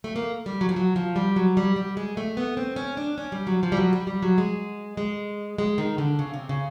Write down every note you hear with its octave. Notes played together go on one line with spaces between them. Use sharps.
A3
A#3
G3
F#3
F3
F#3
F3
G3
F#3
G3
G3
G#3
A3
B3
C4
C#4
D4
C#4
G3
F#3
F3
G3
F#3
G3
G3
F#3
G#3
G#3
G#3
D#3
D3
C#3
C3
C#3